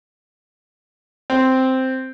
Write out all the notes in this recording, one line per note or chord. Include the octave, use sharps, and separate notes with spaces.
C4